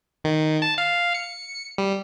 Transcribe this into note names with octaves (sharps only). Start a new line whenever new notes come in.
D#3
A5
F5
C#7
G3